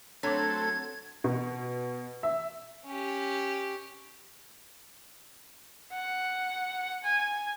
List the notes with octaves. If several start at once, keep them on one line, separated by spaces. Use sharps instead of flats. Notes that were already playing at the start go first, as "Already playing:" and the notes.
F#3 A3 C4 D4 A4 C#5 D6 G#6
B2
E5
C#4 G4
F#5
G#5